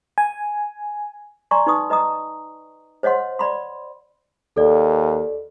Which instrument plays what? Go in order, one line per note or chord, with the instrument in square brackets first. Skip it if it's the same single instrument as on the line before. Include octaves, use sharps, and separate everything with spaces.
[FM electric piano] G#5
[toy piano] D5 G#5 A#5 C6 C#6
D#4 B4 C#6 D#6
B4 D#5 A#5 D#6
C5 C#5 D#5 F#5 C6
D5 B5 C6
[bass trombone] D#2 [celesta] A4 D5